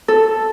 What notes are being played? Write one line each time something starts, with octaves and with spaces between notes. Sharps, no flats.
A4